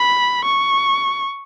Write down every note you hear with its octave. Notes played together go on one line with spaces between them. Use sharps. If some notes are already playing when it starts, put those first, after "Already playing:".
Already playing: B5
C#6